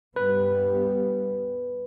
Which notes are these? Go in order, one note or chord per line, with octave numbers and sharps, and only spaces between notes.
G2 G3 B3 B4